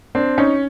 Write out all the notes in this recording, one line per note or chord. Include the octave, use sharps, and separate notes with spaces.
C4 D4
C#4 D#4